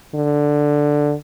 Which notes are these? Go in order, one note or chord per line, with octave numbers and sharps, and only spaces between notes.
D3